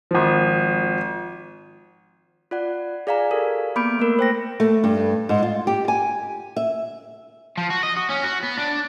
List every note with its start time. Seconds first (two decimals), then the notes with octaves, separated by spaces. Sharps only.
0.11 G#1 F3
2.51 F4 D5 F#5
3.07 G#4 D5 F5 G#5 A#5
3.31 G4 A4 A#4 F5
3.76 A#3 B3 B5 D6 G6 D7
3.99 A3 A#3 A#4
4.19 C5 G5 A#6
4.60 A3
4.84 G2
5.29 G#2
5.43 F4
5.67 G4
5.88 G#5
6.56 E5
7.57 F3
7.70 F#4
7.83 D#5
7.97 F#4
8.10 C#4
8.24 F#4
8.44 B3
8.58 D4